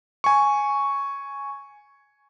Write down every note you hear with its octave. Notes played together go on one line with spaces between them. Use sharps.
G#5 C#6